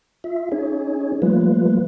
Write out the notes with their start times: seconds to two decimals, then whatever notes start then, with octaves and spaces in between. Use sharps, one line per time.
0.24 F4 E5
0.52 C#4 D#4 G#4 C#5
1.22 F3 G3 A3 A#3 F4 B4